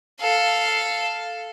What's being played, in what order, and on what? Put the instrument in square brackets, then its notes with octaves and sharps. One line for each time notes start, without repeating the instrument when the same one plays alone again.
[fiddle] A4 F5